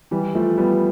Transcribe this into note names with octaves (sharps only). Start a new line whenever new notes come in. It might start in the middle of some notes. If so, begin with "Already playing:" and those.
E3 G3
F3 A3
G3 B3